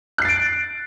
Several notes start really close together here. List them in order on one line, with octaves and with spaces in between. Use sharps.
F#6 C7 A6 D7